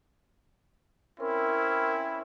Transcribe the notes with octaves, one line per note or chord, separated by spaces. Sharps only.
C4 C#4 E4 A#4